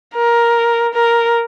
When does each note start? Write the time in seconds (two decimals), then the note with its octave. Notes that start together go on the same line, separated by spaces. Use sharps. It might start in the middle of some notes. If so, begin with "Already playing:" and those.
0.15 A#4
0.94 A#4